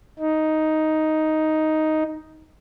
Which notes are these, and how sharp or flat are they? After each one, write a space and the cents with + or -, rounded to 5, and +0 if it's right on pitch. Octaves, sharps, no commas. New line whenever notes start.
D#4 +5